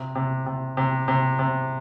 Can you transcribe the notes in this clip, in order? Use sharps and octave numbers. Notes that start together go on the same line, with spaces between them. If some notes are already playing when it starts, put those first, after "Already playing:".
Already playing: C3
C3
C3
C3
C3
C3